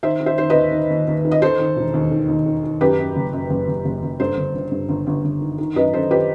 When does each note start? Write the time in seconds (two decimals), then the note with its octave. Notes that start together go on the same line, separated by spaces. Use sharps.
0.03 D#3 C5 E5
0.21 D#3
0.26 C5 E5
0.38 D#3 C5
0.50 D#2 B4 D#5
0.72 D#3
0.90 D#2
1.08 D#2
1.25 D#3
1.31 D#5
1.42 D#3 A4 C5
1.59 D#3
1.77 E1
1.94 D#2
2.11 D#3
2.28 D#2
2.46 D#3
2.64 D#3
2.81 F#2 G4 B4
2.99 F#2
3.16 F#1
3.33 F#2
3.50 F#1
3.68 F#1
3.85 F#1
4.03 F#1
4.20 G2 A4 C5
4.37 G1
4.55 G1
4.72 G2
4.89 G1
5.07 G1
5.24 G1
5.41 D#3
5.58 D#3
5.76 F#2 B4 D#5
5.93 F#2 A4 C5
6.11 G4 B4